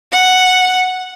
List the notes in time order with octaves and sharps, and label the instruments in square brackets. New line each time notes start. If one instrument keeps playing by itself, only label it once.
[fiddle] F#5